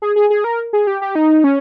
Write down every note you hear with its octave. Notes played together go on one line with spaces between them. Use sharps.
G#4
G#4
G#4
A#4
G#4
G4
G4
D#4
C#4